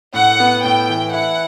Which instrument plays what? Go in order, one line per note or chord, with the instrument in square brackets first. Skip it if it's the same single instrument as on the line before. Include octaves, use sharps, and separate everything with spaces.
[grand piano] A2 [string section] F#5
[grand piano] B3
[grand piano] A2 [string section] G5
[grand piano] E3
[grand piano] E4 [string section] F#5